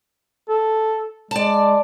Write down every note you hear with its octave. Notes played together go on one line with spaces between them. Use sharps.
A4
G#3 D5 A5